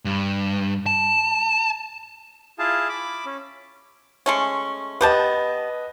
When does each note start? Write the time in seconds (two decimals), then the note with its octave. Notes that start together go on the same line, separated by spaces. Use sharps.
0.05 G2
0.86 A5
2.59 E4 F4 G#4 F5 A5
2.89 B5 D6
3.26 C#4
4.26 G#3 A3 C#4
5.01 B3 G4 B4 D#5 A5